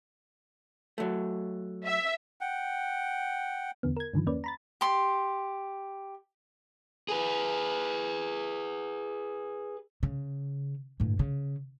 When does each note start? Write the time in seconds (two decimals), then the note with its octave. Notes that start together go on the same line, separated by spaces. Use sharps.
0.98 F#3 A3
1.86 E5
2.41 F#5 G5
3.83 E2 D3 B3
3.96 A#4 G#6
4.13 G2 D3 D#3 F3
4.26 E2 A#3 C#4 B4 D5
4.44 A#5 B5 A6
4.81 G4 C6
7.09 G#4 B4
10.03 C#3
11.00 G1 A2
11.19 C#3